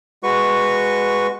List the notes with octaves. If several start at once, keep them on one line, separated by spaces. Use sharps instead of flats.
G#3 F#4 B4 C#6